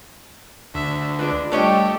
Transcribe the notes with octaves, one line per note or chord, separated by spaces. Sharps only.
D2 E5
G#3 D4 F4 B4 D5
G3 A3 D4 G4 C#5 D#5 G5 E6